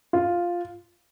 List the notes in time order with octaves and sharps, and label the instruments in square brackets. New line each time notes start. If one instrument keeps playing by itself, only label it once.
[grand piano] F4